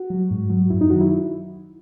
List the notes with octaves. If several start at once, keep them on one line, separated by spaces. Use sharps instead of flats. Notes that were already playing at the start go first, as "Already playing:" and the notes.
Already playing: F#4
F#3
G#2
F#3
F#2 E4
D#4
D#3 F#3 F#4
E4